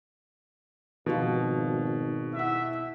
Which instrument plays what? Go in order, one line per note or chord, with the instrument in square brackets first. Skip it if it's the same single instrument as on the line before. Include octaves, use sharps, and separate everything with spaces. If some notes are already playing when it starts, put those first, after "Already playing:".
[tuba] G#1 [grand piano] B2 [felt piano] F3 F#4 F5
[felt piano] E4 F#5 [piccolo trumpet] E5